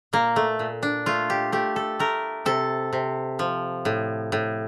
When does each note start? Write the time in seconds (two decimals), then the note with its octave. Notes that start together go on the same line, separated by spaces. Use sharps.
0.13 A#2 A#3
0.36 A3
0.59 A#2
0.83 D4
1.06 A3 F4
1.30 G4
1.52 A3 G4
1.76 A4
1.99 A3 A#4
2.46 C3 A4
2.93 C3
3.39 F3
3.85 A2
4.32 A2